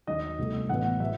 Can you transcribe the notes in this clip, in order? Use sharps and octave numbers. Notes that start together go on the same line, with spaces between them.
D#2 D#3 F#3 D#5
C2 B2 A3
A1 A2 F#3 B3 F#5
F#3 E5